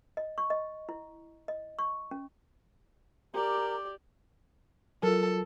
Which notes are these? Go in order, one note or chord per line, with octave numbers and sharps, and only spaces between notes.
D#5
C#6
D#5
E4
D#5
C#6
C#4
G4 A#4 D5 A#5
F#3 F4 A4 A#4